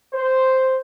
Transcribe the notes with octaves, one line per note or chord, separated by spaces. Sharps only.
C5